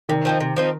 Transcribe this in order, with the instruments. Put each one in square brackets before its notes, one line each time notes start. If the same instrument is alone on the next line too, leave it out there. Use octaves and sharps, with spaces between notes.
[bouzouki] C3 [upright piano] D#3
[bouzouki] F3 C4 D#4
C3
F3 C4 D#4